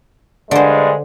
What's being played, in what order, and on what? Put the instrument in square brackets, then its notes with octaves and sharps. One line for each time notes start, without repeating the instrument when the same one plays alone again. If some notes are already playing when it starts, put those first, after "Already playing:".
[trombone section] G2 G#3 [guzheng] D3 C5